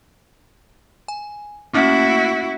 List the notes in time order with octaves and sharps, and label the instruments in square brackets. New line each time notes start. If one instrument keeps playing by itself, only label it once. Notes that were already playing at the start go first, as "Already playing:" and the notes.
[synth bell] G#5
[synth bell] A3 A#3 C#4 [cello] E4 F#4